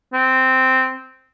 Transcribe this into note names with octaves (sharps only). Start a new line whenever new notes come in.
C4